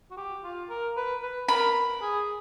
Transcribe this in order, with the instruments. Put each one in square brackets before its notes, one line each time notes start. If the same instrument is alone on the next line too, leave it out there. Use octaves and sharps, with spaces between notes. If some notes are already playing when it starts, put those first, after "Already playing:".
[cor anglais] F#4
G4
F4
A#4
B4
B4
[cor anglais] A#4 [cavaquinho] B5
[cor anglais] G#4